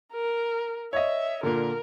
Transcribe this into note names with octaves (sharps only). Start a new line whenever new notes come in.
A#4
C#5 D#5 E5
A#2 D3 A#4